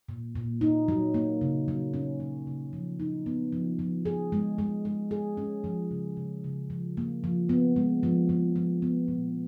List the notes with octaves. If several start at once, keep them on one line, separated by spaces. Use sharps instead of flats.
A#2
A#2
D#4
F#3
A#3
C#3
F#3
C#4
F#3
C#3
F3
D#4
B3
F3
F3
G#4
G#3
G#3
G#3
G#4
C#4
F3
C#3
C#3
C#3
F3
A#3
F3
B3
G#3
F3
F3
F3
B3
A#2